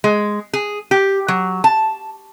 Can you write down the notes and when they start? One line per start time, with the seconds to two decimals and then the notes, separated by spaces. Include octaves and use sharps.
0.04 G#3
0.53 G#4
0.91 G4
1.28 F#3
1.64 A5